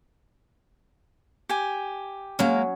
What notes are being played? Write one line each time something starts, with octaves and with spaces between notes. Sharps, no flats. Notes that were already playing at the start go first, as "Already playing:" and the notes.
G4 G#5
F#3 G#3 A#3 C#4